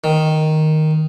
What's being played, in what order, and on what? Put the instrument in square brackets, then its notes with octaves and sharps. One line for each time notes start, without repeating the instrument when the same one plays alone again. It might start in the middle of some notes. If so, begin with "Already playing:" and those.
[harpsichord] D#3